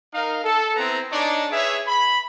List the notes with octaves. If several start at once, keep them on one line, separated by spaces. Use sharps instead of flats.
D#4 A#4 F5
A4
B3 C4 E4 B4 A#5
D4 D#4 G#4 C#5 D5
G#4 B4 C#5 E5
B5